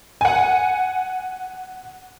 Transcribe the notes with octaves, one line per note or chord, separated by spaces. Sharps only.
F#5 G#5